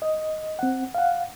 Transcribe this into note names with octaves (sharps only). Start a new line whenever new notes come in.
D#5
C4 F#5
F5 F#5